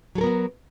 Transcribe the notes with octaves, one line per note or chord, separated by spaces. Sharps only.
F#3 B3 F#4 A4 A#4